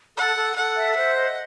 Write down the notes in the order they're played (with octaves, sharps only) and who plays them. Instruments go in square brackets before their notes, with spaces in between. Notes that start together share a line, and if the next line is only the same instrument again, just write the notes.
[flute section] A4 [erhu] F#5
[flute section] A4
[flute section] A4 [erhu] F#5
[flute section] E5
[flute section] C5 [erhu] F#5
[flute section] D#5